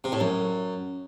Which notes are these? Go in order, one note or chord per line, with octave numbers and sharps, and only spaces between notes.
C3
A2
F#2